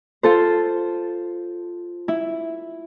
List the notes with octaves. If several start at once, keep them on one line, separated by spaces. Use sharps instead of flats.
F4 A4 C5
E4